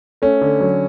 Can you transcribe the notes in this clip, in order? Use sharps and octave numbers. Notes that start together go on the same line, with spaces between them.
A3 C#4
D3
F#3